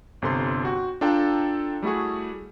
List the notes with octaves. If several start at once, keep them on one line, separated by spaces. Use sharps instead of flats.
G1 C3 A4 C6
F#4 G5
D4 F4 A4 G5 A#5
G3 A3 E4 F#4 G#4